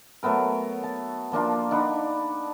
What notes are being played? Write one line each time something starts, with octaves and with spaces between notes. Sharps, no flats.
F#3 A3 B3 A#4
A5
F3 A#3 D4 F4
D4 D#4 F#5 B5